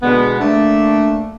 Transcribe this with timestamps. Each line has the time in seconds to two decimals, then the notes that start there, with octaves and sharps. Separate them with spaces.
0.03 B2 D3 G#3 B3
0.40 A3 A#3 D4